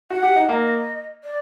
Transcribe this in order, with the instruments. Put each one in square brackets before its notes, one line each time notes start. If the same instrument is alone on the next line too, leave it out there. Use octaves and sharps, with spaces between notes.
[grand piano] F#4 [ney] F#5
[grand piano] G4
D#4
[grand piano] A#3 [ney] D#5 F#5
[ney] D5